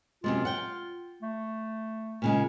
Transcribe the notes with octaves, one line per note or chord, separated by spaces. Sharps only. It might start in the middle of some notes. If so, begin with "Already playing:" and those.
F#2 C3 G#3 F4
F#5 G5
A3
A#2 C#3 G#3